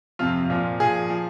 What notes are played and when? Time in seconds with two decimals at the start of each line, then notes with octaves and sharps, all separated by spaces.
0.19 F2 C3 F3 F4
0.50 A#2 F3 F4
0.80 A#2 F3 G#4
1.10 F3